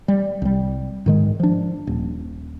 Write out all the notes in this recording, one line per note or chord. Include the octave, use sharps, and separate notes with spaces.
G3
C2 G3
G#2 D#3 G#3
F3 D4
D#1